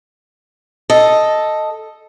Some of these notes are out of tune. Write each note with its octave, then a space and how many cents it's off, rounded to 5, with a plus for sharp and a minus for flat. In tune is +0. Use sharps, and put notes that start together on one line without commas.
A4 +0 D#5 +0